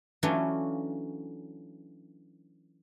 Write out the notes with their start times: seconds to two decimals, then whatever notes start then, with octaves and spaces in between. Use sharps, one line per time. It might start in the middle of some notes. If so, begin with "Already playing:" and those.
0.23 E3 F#3 A3 C#4 D4 F4